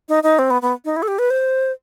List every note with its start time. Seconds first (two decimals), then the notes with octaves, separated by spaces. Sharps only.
0.09 D#4
0.23 D#4
0.39 C4
0.50 B3
0.62 B3
0.85 D#4
0.96 E4
1.03 A4
1.08 G4
1.19 B4
1.30 C5